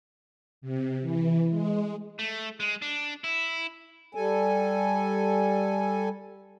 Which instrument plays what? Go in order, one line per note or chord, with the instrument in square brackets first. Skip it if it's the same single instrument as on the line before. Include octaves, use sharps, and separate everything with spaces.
[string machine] C3
E3
G#3
[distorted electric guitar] A3
G#3
D4
E4
[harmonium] G3 A4 G#5